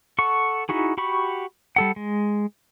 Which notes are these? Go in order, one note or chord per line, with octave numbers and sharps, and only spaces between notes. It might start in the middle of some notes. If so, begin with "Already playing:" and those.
A4 F#5 C#6
D#4 E4 F#4 G#4
F#4 G4 B5 C#6
G3 A4 F#5
G#3